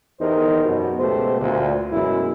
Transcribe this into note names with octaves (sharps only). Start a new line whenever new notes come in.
E2 D#4 G4 A#4 C5
F#2 B2
C#2 B2 A3 G4 C5
D2 A#2
F#2 B2 G#3 E4